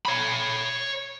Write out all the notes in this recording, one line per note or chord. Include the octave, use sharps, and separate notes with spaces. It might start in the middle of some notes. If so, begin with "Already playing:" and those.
C#5 B5